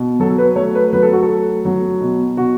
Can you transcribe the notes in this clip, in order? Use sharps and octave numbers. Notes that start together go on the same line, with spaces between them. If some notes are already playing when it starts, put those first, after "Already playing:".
Already playing: B2
F#3 A4
B4
A3 C#5
B4
F#3 B4
A4
F#4
A4
A3
F#3
B2
B2 F#4